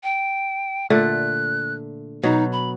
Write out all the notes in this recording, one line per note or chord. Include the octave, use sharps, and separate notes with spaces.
G5
A#2 D3 A3 F#6
B2 F#3 D#4
B5